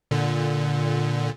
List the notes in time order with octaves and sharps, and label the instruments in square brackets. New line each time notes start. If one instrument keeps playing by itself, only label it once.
[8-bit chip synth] A#2 D3